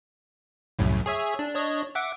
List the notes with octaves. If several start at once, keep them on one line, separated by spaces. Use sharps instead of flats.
C2 F#2 A2
G#4 C#5 E5
D4
D4 C#5 D#5
E5 F#5 D6